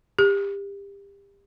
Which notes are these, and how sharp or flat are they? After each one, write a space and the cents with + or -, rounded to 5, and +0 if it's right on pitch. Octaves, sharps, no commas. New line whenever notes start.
G4 +30